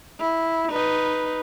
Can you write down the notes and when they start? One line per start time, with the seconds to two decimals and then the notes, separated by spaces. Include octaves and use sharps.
0.20 E4
0.72 D#4 B4